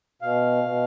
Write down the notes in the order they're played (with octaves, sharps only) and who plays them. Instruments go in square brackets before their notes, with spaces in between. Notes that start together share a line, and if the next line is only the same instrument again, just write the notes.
[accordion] B2 F5
B2